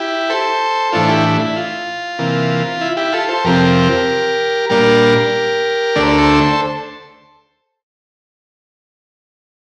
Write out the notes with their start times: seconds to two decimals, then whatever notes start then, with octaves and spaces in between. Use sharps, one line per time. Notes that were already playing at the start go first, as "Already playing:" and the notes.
Already playing: E4 G4
0.30 A4 C5
0.92 A2 E3 A3 D4 F4 A4
1.08 E4 G4
1.40 E4
1.56 F4
2.19 C3 E3 A#3
2.81 E4
2.97 E4 G4
3.13 F4 A4
3.29 A4 C5
3.44 F2 C3 F3 C4 G4 A#4
4.69 A#2 G3 A#3 D4 G4 A#4
5.96 D2 D3 A3 D4 D5
6.03 C5
6.11 A#4
6.18 A4 C5